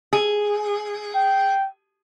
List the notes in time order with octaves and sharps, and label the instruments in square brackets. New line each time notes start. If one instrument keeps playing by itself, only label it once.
[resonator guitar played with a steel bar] G#4
[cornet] G5